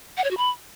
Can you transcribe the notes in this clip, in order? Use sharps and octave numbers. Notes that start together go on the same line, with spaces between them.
F#5
C#5
F#4
B5